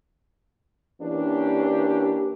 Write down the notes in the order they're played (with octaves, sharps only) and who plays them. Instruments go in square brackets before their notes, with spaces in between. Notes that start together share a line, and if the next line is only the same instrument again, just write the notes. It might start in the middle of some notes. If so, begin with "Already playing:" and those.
[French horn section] E3 A#3 C#4 D4 G4